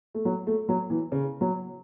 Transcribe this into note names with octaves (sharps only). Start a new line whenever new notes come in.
A3
F#3
A3
F#3
E3
C#3
F#3